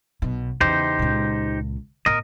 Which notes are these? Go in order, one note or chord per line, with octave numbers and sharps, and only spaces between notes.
B1 B2
E2 C#3 D#4 G4 C5
C#2 A#2
A2 B3 A#4 D#5